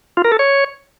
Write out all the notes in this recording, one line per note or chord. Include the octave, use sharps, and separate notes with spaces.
F4
A#4
A4
C#5